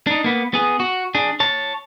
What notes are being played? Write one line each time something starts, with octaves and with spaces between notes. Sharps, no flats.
D4 D#4
A#3 B3
B3 G#4
F#4
D4 G#4
C#5 A5